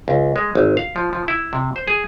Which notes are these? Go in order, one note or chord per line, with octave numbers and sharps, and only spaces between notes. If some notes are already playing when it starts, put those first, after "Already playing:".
C#2
G#3
G#1
F5
F3
F3
E4
C3
C5
G#4